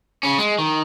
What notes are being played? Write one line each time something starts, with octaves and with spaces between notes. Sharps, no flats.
C#3 C#4
G#3
D#3